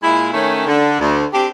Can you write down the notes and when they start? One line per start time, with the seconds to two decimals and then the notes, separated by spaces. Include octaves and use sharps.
0.03 A#2 G#3 E4
0.33 D#3 A3 C#4
0.67 D3
1.00 D2
1.33 C4 D4 G4